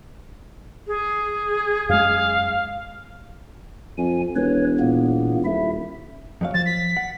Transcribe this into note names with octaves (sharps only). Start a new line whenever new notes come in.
G#4
F#2 G#3 F5
F2 G#5
E1 B4 C#5
A#2 A#3 B3
D#1 E4 E5
F2 F#3 F5
F3 A6
B6
F#5